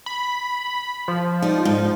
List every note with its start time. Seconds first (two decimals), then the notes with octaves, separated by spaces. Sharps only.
0.06 B5
1.08 F3
1.42 D#4 D5
1.65 G#2 D#4